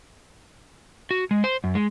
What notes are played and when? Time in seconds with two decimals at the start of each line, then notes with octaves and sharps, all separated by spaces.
1.11 F#4
1.31 G#3
1.44 C5
1.64 F#2
1.75 G#3